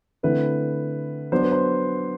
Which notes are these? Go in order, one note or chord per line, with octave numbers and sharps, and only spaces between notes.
D3 A3 C4 E4 B4
F#3 B3 D4 C5
B4
C5